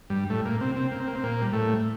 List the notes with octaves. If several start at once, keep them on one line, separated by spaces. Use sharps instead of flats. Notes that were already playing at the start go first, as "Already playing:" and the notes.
G2 G3
A2 A3
A#2 A#3
C3 C4
C3 C4
A#3
C4
A#3
C4
A#2 A#3
G3
A2 A3